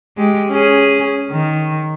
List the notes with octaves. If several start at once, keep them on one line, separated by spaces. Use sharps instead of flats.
G#3 G4
C#4 G#4
D#3